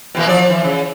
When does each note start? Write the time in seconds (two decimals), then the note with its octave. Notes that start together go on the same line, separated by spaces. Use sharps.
0.15 B2 E3 A#3
0.27 F3 D5
0.50 E3
0.64 C#3